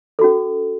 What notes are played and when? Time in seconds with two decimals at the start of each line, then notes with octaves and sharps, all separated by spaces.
0.19 A4
0.21 F#4
0.24 C#4